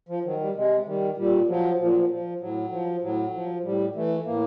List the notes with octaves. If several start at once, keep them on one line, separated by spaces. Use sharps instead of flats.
F3
D#3 F#3
G3
C3 G#3
D#3 G3
A#2 G3
F3 F#3
A#2 F3
F#3
F3
F3
A2 F#3
F3
A2 F#3
F3
A2 G3
E3 A3
A2 A#3